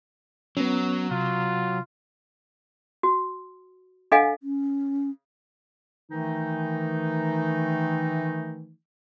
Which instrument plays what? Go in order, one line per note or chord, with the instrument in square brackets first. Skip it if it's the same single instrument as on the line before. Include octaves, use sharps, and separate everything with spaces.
[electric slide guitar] F#3 [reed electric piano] B3 C#4
[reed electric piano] C3 [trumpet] F4
[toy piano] F#4
D4 A4 D#5 F5 F#5 G#5
[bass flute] C#4
[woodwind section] D#3 E3 A3 D#4